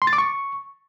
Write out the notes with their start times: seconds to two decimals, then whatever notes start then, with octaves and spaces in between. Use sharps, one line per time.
0.02 C6
0.07 A6
0.13 D6
0.18 C#6